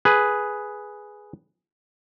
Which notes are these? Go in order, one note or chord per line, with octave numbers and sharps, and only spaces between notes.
G#4 B4